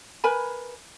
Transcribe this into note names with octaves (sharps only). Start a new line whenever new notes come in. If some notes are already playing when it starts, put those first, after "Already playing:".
A#4 B4 G#5 B5